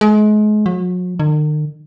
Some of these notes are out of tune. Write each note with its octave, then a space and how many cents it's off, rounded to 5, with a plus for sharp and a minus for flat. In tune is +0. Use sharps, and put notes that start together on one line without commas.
G#3 +35
F#3 -40
D#3 -45